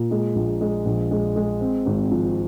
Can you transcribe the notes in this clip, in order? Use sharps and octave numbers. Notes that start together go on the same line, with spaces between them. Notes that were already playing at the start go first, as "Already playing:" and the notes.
Already playing: A#2
G#3
A#1
G#3
A#1
G#3
G#3
C4
G#1
F3